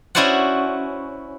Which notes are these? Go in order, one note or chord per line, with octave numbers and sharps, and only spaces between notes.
C#4 E4 F#4 C5 D5 F#5